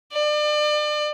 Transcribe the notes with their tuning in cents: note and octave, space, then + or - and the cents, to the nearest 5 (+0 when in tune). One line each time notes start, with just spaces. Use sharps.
D5 +35